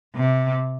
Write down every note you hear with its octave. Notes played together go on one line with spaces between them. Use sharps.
C3